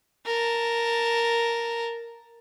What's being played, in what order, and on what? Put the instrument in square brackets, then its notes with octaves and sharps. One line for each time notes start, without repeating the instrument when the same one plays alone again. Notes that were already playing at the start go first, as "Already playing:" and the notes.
[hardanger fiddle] A#4 A5